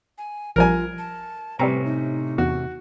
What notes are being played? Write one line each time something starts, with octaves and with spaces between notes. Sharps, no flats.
G#5
A#1 F3 G3 F4 A#4 G#5
A5
A2 C3 G3 C4 C#4 B4 A#5
D#4
E2 F#4